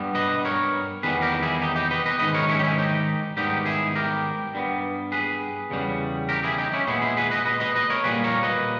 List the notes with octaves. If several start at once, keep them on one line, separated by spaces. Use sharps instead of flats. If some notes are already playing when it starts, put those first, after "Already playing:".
Already playing: G2 G3 B3
B4 D#5
A#4 C#5
E2 D#3 G3 B3 G#4 B4
G4 A#4
E4 G#4
D#4 G4
D#4 G4
B4 D#5
B4 D#5
G#2 D#3 G#3 B4 D#5
A#4 C#5
C#4 E4
G4
C#4 E4
D#4 G4
G#2 D#3 G3 B3 D#4 G4
E4 G#4
G4 A#4
G2 G3 B3
G#4 B4
E2 C#3 G3 B3
G4 A#4
E4 G#4
D#4 G4
C#4 E4
A#2 G#3 B3 E4 G#4
E4 G#4
G#4 B4
B4 D#5
B4 D#5
B4 D#5
B4 D#5
A#4 C#5
A#2 G3 A#3 G#4 B4
A#4 C#5
B4 D#5